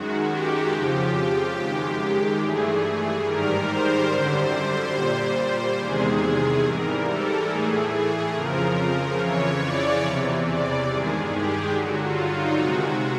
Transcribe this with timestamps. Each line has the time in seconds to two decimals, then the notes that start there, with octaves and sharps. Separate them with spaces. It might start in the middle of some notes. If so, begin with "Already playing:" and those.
Already playing: F#2 D#3 G#3 F#4
0.28 G4
0.70 F2 C#3 F3
1.56 F#2 D#3 G#3
2.40 G2 E3 A3 G#4
3.24 G#2 D#3 G3 A#4
3.68 C5
4.10 F#2 D3 G3
4.95 A#2 G3
5.79 E2 C3 D#3 G#3 G#4
6.64 G#2 E3 G3 A#4
7.06 A4
7.48 A2 E3 A3 G#4
7.91 G#4
8.34 F2 C#3 F3 A#4
9.18 F2 C#3 E3 C#5
9.61 D5
10.03 E2 C3 E3
10.46 D5
10.87 G2 D#3 G#3 G#4
11.30 G4
11.72 G2 D3 F#3 F#4
12.01 F4
12.29 D#4
12.57 C3 D#3 G#3 F#4